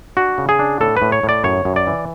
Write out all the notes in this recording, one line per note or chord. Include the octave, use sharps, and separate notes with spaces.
D4 F#4
C#3
G#4
D4
A2 A4
B4
A2
C#5
A2
D5
F#2 C#5
F#2
D5
E3